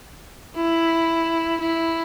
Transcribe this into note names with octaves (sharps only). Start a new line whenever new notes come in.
E4
E4